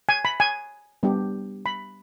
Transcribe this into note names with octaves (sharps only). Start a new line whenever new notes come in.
G#5
B5
G#5
G3 B3 D4 G4
B5